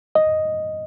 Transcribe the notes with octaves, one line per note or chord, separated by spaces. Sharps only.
D#5